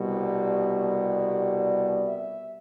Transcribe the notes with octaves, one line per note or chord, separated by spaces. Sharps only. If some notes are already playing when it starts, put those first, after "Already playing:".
Already playing: C2 B2 G3
D5
E5